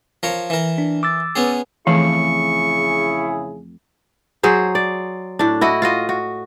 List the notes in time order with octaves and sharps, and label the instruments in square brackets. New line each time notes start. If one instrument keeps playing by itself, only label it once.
[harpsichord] F3 A#4 C#5
E3 A#4
[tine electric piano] D4
D6 E6 A6
[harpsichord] B3 C#4 G#4
[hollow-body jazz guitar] F2 A3 F5 [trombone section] C#3 E4 G#4 [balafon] E3 [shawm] C#6
[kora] F#3 G#4 C5
D5
A2 D4
E4 F#4 D#5
F4 F#4 D#5
F#4